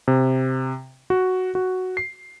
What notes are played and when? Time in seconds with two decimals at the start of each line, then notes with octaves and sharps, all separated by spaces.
0.08 C3
1.10 F#4
1.55 F#4
1.97 C7